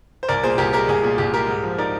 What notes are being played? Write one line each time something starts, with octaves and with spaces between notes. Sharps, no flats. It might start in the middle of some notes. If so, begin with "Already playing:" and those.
C5
C2 A#4 D5
A#2 G#4 C5
C2 G4 A#4
G#3 G4 A#4
C2 G#4
A#2 G#4
C2 G4
G#3 G4 A#4
G#2
F3
D#4 A#4 D5